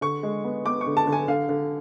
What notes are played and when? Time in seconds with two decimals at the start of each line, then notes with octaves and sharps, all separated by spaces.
0.01 D3 C#6
0.23 G#3
0.44 B3
0.65 B3 D6
0.81 C#6
0.86 D3
0.97 A5
1.07 D3
1.12 G#5
1.28 D3 F5
1.49 D3